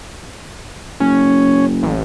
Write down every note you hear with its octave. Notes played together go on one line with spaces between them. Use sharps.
F#1 C#4
A1